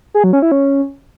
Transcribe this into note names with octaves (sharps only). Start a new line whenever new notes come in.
G#4
F#3
C#4
E4
C#4